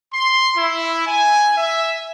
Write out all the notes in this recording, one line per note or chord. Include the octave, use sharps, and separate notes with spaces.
C6
E4
G#5
E5